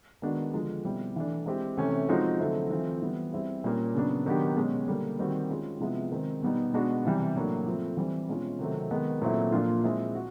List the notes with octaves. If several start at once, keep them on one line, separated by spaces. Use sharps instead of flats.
D#3 G#3 B3 D4 F#4
D3 F3 G#3
B2 G3 C4 E4
E3 A3 D4
G#3 C4 E4 G4
C3 E3 A3 C#4
F3 G#3 C4 D#4 F#4
D3 F#3 A3 C4 E4
E3 A3 C4 F4
E3 G3 B3
G3 C4 E4 G#4
A#2 G3 A#3 C#4
C#3 F#3 B3 D4
D#3 F#3 B3 D4 G4
B2 G#3 C#4
D3 G3 A#3
D#3 G3 C4 D#4 F#4
G#3 C#4 F4 G#4
C3 F3 G#3 B3 E4
D#3 G#3 C4
B2 G3 B3 D#4
B2 G#3 B3 D4 F#4
C3 E3 G3
A2 F#3 A#3 D4
F3 A3 C4
E3 G3 C4
B2 G#3 C#4 F4
C3 D#3 F#3 A3 C4
D#3 G#3 B3
A#2 F#3 A3 C4 E4
A#2 F3 A#3 D4 F4
G#3 C4 E4 G#4
F#4